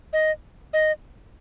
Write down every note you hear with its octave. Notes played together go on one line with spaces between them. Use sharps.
D#5
D#5